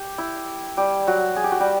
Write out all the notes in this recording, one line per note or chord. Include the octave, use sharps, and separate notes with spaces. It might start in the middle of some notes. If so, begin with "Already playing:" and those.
Already playing: G4
E4
G3 G4
F#3 F#4
G#4
G4
F#4
G3 G4